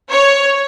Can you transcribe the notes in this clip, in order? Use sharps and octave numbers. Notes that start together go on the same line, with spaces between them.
C#5